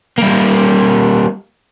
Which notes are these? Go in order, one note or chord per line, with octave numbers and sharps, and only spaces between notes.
G3 A#3